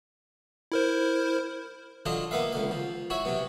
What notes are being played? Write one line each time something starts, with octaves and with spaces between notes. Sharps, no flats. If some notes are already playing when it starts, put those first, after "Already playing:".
E4 A#4 C5
D3 F#3 D4 F4 D#5
A#3 B3 B4 E5 F5
C#2 D3 F5
F3
E4 F#4 C#5 E5
C3 F#3 B3